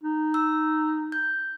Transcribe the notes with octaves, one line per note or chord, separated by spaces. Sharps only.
D#4
E6
G6